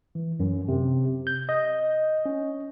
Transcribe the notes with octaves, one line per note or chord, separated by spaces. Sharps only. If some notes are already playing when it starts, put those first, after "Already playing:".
E3
F#2
C3
G6
D#5
C#4